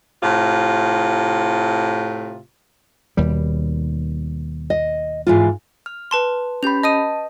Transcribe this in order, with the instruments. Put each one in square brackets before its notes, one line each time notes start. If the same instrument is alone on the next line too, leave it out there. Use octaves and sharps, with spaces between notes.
[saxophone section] A2 C3 F4
[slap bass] D#2 B2 G3
[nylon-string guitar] D#5
G#2 E3 F4
[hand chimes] F6
[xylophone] B4 A5 C6
[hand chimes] C#4 G4 B5 [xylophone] G6 F7
[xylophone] D#5 D#6 D#7 [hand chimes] A5